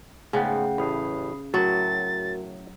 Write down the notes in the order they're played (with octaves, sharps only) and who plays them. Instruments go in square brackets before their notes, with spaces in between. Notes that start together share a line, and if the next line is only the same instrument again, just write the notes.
[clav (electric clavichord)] G#2 B3 [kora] C#3 [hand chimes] A3 F#5 G5
[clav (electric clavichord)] A1 A2 [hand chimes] B5 D#6 C7
[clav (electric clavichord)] A2 E5 [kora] F#3 [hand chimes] F#4 A#4 [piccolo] A6